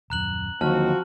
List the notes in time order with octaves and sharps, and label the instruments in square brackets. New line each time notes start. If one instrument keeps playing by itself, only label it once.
[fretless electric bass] D#1 F#2 [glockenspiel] A#5 F#6 F#7
[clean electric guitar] D#2 [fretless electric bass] D3 F#3 [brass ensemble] F3 C4 F#4 [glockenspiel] A5 F6